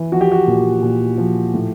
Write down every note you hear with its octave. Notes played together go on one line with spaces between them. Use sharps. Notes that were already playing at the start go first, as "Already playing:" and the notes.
Already playing: E3
F3 F#4
G4
F#4
A#2
A#2
F3
A2